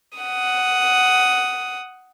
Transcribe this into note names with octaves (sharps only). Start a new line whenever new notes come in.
F#5 D#6